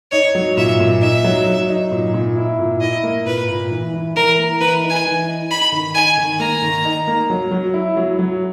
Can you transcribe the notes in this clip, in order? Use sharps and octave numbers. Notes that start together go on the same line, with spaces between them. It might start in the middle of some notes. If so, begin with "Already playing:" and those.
D#4 C#5
F#3
A#2 E5
A#2
D#4 E5
F#3
F#3
D#4
A#2
A#2
E4
A#2
E4 D#5
A#3
A#2 B4
A#2
E3
E3
E3 A#4
A#3
E3 B4
D#4
G#5
E3
D#4
D#4 B5
D#3
D#4 G#5
D#3
A#3 A#5
D#3
D#4
A#3
F#3
F#3
E4
F#3
F#3